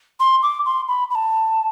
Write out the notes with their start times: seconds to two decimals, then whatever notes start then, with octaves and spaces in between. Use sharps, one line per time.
0.19 C6
0.42 D6
0.65 C6
0.88 B5
1.10 B5
1.15 A5